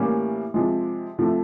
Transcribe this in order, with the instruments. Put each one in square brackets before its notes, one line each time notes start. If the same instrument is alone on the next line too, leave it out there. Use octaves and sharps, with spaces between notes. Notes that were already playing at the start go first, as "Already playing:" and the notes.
Already playing: [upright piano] A2 E3 G3 A#3 C#4
C3 F3 G#3
C3 F3 A3